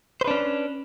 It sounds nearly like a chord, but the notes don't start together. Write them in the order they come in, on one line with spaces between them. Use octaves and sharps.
C5 B4 D4 C#4